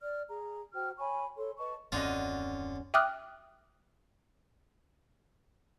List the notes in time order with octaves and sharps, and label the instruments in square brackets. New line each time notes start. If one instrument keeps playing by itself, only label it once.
[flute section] D5 F6
G#4 A#5
F#4 C5 G5 F6
C#5 G#5 B5 C#6
A4 C#5 C6
B4 D#5 A5 C#6
[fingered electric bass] D#1 F#2 C4 [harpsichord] D3 F4 [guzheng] C#4 F#4 D#5
[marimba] E5 G5 D6 D#6 F6 F#6